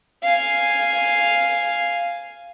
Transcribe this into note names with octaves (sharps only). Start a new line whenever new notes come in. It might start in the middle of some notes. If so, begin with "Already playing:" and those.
F5 G#5